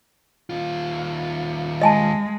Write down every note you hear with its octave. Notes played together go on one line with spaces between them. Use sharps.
D#2 F4
G#3 D#5 G#5 A5